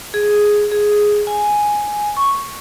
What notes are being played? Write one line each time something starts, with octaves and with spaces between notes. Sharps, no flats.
G#4
G#4
G#5
C#6